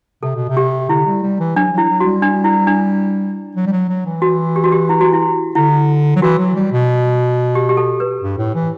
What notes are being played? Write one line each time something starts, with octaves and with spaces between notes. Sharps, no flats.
C3 A4
B2
C3
G4
D3 E4
G3
G3
E3
F#3 D4
F#3 E4
F#3
F#4
G3
D4
E4
D4
F#3
G3
F#3
F#3
E3
F#4
G4
F#4
G4
E4
F#4
E4
D3 E4
F#3
E3 F#4
F#3
G3
B2
G4
G4
A4
B4
G2
A2
E3